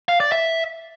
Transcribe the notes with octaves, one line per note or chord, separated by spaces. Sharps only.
F5
D5
E5